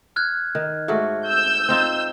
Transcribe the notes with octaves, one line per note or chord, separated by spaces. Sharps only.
F6 F#6 G#6
D#3
G#2 A3 F#4
E6 G6
C4 D#4 F4